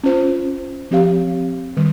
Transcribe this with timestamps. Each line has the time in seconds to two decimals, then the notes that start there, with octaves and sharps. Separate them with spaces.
0.04 C#4 F4 C5
0.91 F3 C4 G4 C#5 F5
1.77 D#3 G3